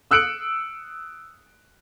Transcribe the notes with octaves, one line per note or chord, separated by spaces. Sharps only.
D#6 E6 F#6 C#7 D7 F#7